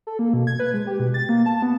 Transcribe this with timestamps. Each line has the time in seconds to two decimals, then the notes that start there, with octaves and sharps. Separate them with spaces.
0.07 A4
0.19 A#3
0.34 B2
0.47 G#6
0.60 B4
0.74 G#3
0.87 G4
1.00 B2
1.14 A6
1.29 A#3
1.46 A5
1.62 B3